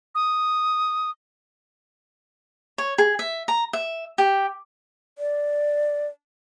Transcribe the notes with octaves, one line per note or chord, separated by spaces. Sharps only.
D#6
C#5
G#4
E5
A#5
E5
G4
D5